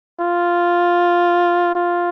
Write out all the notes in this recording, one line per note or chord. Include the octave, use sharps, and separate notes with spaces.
F4
F4